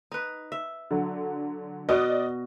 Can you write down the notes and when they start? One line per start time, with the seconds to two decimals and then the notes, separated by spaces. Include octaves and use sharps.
0.12 D#4 B4
0.52 E5
0.91 D3 F#3
1.89 B2 B3 D5 D#5